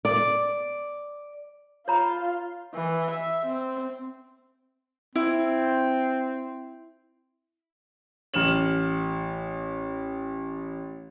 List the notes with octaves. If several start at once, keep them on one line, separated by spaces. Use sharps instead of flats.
D5
F4 C#5 A#5 B5
E3
E5
C4
C4 E4
A1 F6 E7 F#7